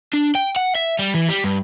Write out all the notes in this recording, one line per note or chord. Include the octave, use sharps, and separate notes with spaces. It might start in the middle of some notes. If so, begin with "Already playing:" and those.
D4
G5
F#5
E5
G3
E3
G3
G2